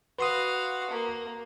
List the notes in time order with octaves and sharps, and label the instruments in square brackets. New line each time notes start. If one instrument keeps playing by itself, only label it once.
[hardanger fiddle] F#4 F5 [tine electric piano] B4 C6 D#6
[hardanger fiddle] A#3